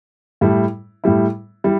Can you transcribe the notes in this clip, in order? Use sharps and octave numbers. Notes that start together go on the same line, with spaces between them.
A2 G3 E4
A2 G3 E4
G3 E4